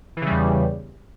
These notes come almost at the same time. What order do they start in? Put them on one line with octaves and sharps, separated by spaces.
E3 C#3 G3 E2